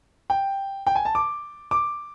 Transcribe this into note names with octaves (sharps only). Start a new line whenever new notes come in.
G5
G5
G#5
A5
D6
D6